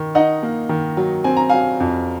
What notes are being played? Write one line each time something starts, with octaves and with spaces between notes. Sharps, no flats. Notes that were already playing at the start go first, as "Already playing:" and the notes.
Already playing: D#3
D#4 D#5 F#5
A#3
D#3
F#3
C4 G#5
A#5
F#3 F5 G#5
F2